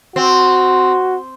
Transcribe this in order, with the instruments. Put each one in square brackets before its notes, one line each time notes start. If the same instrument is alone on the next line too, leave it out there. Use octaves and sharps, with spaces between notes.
[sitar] C4 [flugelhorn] F#4